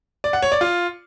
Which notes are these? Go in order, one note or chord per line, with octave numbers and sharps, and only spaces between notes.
D5
F#5
C#5
D5
F4